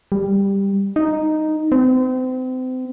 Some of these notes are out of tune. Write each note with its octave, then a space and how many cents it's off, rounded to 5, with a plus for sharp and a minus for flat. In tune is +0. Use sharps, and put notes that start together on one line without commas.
G3 +10
D#4 -5
C4 -35